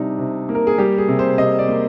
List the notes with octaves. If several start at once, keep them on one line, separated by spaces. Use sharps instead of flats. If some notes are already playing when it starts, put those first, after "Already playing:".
Already playing: C3 G3 D4 D#4
C3
A#3
A#4
G#4
G3 G4
G#4
C3
C5
C3 D#5
D5
A#3